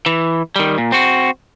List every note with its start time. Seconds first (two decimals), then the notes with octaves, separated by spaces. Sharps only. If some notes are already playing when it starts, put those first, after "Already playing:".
0.06 E3
0.56 D#3 G3
0.78 A#2
0.92 C4 F#4